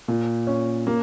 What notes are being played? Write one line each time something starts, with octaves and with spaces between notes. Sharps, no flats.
A#2
C#4
A#3